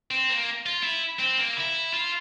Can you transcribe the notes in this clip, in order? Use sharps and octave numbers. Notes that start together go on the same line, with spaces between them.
C4
A#3
F4
E4
C4
A#3
E4
F4